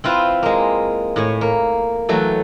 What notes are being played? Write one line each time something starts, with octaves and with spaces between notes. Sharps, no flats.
C4 E4 F4 B4
G#3 A#3
A2 C#5 G#5
A#3
E3 F#3 A3 A4